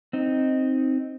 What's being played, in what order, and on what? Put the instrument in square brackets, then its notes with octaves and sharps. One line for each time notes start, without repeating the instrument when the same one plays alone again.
[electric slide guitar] C4 D#4